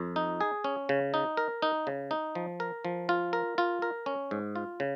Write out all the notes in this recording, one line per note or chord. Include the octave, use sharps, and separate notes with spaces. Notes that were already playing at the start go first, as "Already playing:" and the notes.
Already playing: F2
D#4
G#4
C#4
C#3
D#4
A#4
D#4
C#3
D#4
F3
A#4
F3
F4
A#4
F4
A#4
C#4
G#2
F4
C#3